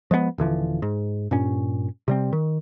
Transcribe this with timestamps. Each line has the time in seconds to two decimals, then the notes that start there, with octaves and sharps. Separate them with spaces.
0.11 F3 G#3 A3 B3
0.38 D#1 D3 E3 F3
0.82 G#2
1.31 G2 A#2 C#4
2.08 C3 G3 C4
2.33 D#3